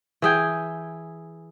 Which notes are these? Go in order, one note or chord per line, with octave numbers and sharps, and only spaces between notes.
E3 G#4 G5